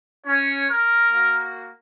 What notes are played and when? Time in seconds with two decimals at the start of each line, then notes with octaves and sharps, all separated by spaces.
0.27 C#4 C#5
0.69 A#4
1.11 A#3 F#4